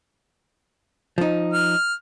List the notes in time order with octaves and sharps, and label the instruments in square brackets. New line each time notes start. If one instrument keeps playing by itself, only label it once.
[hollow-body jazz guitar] F3 D#4
[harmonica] F6